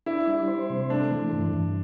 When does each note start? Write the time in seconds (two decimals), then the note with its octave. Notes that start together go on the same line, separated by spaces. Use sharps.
0.06 D4 E4
0.27 G3
0.48 C5
0.70 C3
0.90 A3 D4
1.11 E3
1.33 G2
1.53 G2